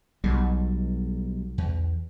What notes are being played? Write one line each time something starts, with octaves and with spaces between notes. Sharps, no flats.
B1 B2 F#3 G3
E2